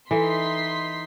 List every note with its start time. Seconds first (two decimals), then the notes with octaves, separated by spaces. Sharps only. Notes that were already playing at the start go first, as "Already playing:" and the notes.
0.11 E3 D#4 A4 C6 B6